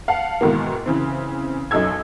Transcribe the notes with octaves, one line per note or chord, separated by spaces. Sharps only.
F5 F#5 A5
G#2 B2 D#3 E3 A#3
C#3 E3 C4
B1 F#2 D#4 A4 E6 G#6